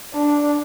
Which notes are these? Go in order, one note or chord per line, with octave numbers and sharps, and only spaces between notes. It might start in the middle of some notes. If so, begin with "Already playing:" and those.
D4